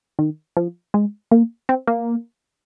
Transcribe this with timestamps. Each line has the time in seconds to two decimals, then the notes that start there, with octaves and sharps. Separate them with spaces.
0.19 D#3
0.57 F3
0.94 G#3
1.31 A#3
1.69 C4
1.87 A#3